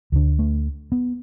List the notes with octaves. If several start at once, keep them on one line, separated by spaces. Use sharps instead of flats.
D2 D3
A3
B3